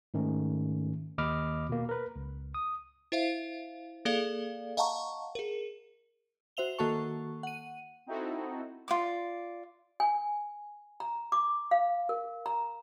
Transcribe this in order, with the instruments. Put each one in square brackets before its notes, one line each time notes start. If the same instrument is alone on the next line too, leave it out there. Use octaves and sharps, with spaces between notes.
[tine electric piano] G#2 D#3 A3 C#4
D#2 D#5 B5 D6 F6
B2 A#3
A#4 B4
C#2
D#6
[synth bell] E4 C5 E5 F5
A#3 G#4 A4 D5 F5
D#5 F5 F#5 A5 A#5 C#6
G#4 A#4
F#4 C5 E5 F7 G7
D#3 A#3 F#4 A4 A5 C#6
F#5 D#7
[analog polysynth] C4 D#4 E4 F#4 A4
[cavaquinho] F4 D5 D6
[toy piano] G#5
A#5
D6
F5
A#4
A#5